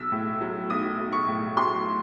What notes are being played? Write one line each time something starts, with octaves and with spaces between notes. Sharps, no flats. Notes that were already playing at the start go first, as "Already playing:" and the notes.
Already playing: B1 E6
A2
F#3
B1 D#6
B1
C#6
A2
F#3 C6